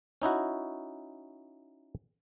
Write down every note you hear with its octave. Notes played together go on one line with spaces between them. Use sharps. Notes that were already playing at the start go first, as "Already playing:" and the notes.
C#4 D#4 E4 F#4